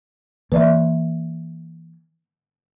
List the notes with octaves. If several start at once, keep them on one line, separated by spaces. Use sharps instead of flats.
E3 A#3 B4 D5 E5